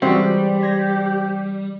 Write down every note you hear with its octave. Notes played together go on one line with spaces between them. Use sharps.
C3 E3 G3 G#3 C4 F#4
G4
C6 G#6 A#6